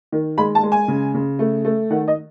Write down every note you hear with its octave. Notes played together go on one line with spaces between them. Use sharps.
D#3
G#3 B5
A5
G#3
G#5
C#3
C#3
A3
A3
D#3 F#5
D#5